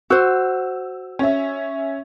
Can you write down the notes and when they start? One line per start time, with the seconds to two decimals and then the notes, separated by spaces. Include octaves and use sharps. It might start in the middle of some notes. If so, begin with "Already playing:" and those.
0.10 F#4 C5 E6
1.19 C#4 E5